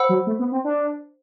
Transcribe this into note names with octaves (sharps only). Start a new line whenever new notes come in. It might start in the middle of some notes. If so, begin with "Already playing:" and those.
Already playing: C5 F#5 B5 E6
F#3
A3
B3
C4
D4